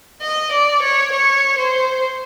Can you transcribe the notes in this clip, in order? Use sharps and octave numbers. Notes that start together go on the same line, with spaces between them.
D#5
D5
C#5
C#5
C5